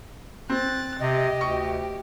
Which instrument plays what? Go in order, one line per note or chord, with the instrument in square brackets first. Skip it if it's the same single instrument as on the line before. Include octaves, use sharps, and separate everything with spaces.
[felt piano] C4 [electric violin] F#6 A6
[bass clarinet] C3 [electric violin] G4 [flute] D#5
[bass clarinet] D2 [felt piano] C#6